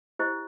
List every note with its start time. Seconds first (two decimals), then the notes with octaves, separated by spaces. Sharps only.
0.19 E4 G4 C5 D#5